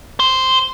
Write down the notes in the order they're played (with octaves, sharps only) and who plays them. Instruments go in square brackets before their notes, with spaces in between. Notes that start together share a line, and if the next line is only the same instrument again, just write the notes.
[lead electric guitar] C5